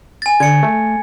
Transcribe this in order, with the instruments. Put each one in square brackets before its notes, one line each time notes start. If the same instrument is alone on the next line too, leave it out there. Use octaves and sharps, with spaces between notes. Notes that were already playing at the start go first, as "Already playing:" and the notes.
[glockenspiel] G#5 A6
[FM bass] D3 [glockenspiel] G#6 C#7
[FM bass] A3